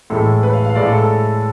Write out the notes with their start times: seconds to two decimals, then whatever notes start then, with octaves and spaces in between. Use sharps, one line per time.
0.10 A2 E3 G#3 A4
0.43 B4
0.53 F5
0.65 F5
0.75 A2 G#3 D5
0.87 A4
0.98 A4